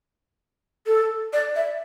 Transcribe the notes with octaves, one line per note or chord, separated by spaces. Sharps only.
A4
D5
E5